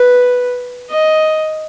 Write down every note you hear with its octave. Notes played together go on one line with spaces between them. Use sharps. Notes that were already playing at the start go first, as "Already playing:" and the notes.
Already playing: B4
D#5